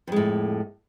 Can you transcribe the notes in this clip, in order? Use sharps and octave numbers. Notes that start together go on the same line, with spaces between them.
F2 A2 G#3